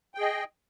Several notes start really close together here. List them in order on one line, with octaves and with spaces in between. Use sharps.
G5 G#4 D#5